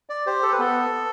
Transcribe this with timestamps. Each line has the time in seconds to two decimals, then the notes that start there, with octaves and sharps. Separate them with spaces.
0.10 D5
0.26 G4 C5
0.43 A4
0.52 B4
0.59 B3 A4